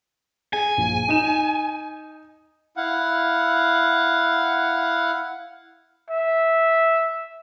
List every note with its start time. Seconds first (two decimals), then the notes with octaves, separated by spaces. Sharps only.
0.53 G#4 G#5
0.77 A#1
1.09 D#4 E7
2.77 E4 F5 F#5
6.10 E5